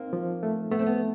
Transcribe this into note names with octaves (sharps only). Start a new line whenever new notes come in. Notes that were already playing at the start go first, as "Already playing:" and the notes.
Already playing: A#3 C4 D#4
F3
A3
A3 B3
C4
B3